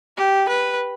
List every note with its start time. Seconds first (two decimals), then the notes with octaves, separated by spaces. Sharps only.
0.17 G4
0.49 B4